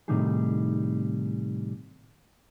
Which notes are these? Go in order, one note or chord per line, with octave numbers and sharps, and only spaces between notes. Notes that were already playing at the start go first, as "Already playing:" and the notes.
A2 C3 D#3 G3 D#4 G#4